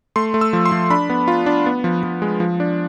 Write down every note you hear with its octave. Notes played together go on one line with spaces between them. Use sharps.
A3 C6
A3
E6
F3
C6
F3
D4 B5
B3
F4
D4
B3
F3
F3
G#3
F3
D4